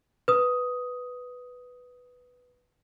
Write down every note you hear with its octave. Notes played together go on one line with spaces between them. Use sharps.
B4 D#6